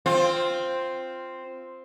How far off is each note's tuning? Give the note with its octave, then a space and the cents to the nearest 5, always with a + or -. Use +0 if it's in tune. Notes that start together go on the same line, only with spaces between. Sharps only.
C4 +0 F4 +0